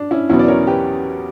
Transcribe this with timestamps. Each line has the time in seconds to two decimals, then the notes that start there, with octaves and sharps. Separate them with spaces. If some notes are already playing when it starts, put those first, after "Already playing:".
Already playing: D4
0.11 C#4 E4
0.29 E2 B2 F#3 B3 C#4 E4
0.39 D5
0.48 A#4 C#5
0.67 G4 B4